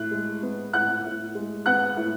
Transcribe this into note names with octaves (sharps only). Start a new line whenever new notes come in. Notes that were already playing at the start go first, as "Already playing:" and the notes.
Already playing: A2 F#6
G#3
B3
A2 F#5 F#6
A2
G#3
B3 F#5 F#6
A2